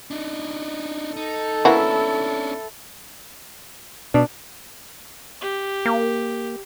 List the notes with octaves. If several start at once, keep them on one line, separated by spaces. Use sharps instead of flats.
D4 D#4
D#4 A4
E3 A#3 C#4 D4 E4 F#4
B2 D4
G4
A#3